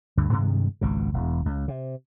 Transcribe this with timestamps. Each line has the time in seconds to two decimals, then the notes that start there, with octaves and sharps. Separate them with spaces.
0.17 D2 G2 D3
0.31 G2 C3 D#3 G#3
0.81 G#1 C#2 B2
1.14 E1 E2
1.46 C#2
1.68 C3